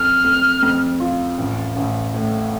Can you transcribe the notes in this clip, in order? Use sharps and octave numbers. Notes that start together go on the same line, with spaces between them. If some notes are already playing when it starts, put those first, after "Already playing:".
Already playing: F2 F6
F2
F2
F4
A1
A1
A2